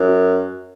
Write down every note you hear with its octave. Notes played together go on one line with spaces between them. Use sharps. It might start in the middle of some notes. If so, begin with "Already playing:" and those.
Already playing: F#2